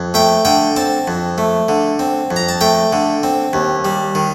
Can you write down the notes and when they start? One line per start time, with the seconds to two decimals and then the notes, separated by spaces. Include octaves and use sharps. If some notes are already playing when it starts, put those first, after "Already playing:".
Already playing: F2
0.14 A3 G5
0.45 D3 G5
0.76 C4 A5
1.08 F2
1.38 A3
1.69 D3
1.99 C4
2.31 F2
2.36 A#5
2.49 A5
2.61 A3 G5
2.93 D3
3.23 C4
3.53 D#2
3.85 G3
4.15 D#3